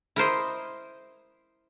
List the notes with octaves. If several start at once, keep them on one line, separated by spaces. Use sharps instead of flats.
E4 A#4 C5 D#5